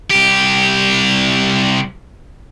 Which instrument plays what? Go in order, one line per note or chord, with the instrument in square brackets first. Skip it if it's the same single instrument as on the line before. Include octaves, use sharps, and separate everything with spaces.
[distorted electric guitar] C2 G4